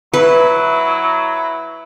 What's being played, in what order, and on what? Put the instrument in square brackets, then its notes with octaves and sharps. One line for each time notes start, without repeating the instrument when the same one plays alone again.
[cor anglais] F#3 [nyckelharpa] E4 [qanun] B4